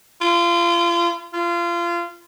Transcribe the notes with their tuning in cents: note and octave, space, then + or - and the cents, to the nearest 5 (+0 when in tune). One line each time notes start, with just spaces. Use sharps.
F4 -30
F4 -25